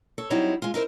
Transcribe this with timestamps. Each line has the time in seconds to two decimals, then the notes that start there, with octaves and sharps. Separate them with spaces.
0.18 A4 C#5
0.30 F#3 G3 C4 D#4 E4 C#5
0.62 G#3 F4
0.74 D#4 E4 A#4 C5